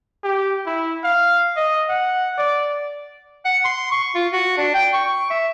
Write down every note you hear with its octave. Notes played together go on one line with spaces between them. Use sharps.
G4
E4
F5
D#5
F#5
D5
F#5
C6
C#6
F4
F#4
D4
G5
C#6
C#6
E5